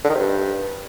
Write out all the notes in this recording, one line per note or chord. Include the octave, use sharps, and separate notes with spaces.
D3
D#3
C3
G2